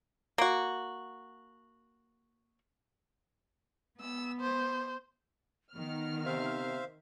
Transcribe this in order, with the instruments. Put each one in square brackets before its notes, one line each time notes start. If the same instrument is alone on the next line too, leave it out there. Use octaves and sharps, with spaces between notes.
[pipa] A#3 F#4
[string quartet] B3 [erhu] E6
[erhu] C5
[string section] D#3 F6 [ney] B3
[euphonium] C3 [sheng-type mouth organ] C5 E5 F5